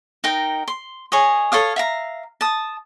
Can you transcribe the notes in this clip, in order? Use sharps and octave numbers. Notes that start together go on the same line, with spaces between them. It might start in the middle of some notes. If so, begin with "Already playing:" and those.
D#4 A#4 G5
C6
G#4 C#5 D#5
A4 C#5 F5 D#6
E5 F5 A#5
A5 D#6